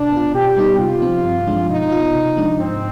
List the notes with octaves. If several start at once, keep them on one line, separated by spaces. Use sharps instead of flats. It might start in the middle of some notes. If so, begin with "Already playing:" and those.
Already playing: B2 D4
B3 F4
B2 G4
G3 B3 D#4
C3 F4
F3 C4
G2
F3 G#3 D4
B2 D#4
B3 F4
C3
F3 G#3 D4
G#2 C4